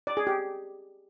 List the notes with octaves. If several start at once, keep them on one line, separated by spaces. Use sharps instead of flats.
D5
G#4
G4